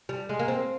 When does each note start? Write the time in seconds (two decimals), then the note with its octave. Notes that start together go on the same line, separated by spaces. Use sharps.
0.09 G3
0.29 G#3
0.39 A#3
0.48 C4